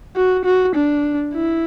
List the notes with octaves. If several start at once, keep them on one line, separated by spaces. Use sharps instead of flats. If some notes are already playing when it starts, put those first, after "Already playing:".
F#4
F#4
D4
E4